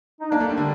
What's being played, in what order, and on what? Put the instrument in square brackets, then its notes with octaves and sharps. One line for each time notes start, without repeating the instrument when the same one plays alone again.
[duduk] D#4
[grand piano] A#3 [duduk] D4
[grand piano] A3
G3
D3